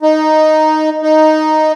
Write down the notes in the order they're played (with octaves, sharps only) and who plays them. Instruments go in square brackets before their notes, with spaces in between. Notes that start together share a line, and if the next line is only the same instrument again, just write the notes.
[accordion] D#4
D#4